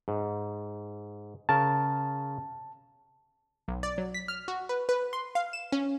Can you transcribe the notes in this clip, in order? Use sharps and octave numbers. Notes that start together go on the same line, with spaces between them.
G#2
C#3 A#4 A5
B1
D5
F#3
B6
F6
F#4
B4
B4
C6
F5
E7
C#4